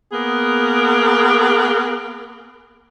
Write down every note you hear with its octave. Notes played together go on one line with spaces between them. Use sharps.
A#3 B3 G#4 A#4